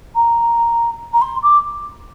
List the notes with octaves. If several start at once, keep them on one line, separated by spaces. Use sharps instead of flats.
A#5
A#5
C6
D6